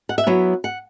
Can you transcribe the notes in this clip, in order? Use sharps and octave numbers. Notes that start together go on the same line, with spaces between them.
F#5
E5
F#3 B3 E4 C#5
F#5